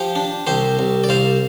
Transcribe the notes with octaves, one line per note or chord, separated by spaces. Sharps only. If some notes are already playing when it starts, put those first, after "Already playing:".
Already playing: F3 G4 C5
D4
C2 G4 C5
C2
D5
C2 C5 F5